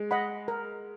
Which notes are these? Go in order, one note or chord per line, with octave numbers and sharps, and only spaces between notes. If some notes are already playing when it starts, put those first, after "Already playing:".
Already playing: G#3
D#5 F#5 B5
A#4